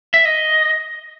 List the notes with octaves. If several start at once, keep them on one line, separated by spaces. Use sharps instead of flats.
E5
D#5